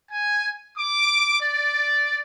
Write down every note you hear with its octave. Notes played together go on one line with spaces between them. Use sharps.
G#5
D6
D5